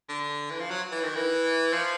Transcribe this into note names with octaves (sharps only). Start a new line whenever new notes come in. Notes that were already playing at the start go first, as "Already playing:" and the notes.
D3
E3
F3
F#3
E3
D#3
E3
F3